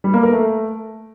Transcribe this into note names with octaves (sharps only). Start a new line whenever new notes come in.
G3
A#3
A#4
A3